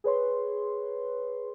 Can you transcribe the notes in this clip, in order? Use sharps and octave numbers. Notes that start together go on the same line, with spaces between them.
G#4 B4 C#5 C6